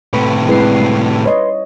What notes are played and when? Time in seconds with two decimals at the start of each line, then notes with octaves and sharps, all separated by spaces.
0.13 A2 C3 B4 B5 C#6
0.48 G3 G#3 C4 E4 B4 C7
1.25 B4 C#5 D#5 C6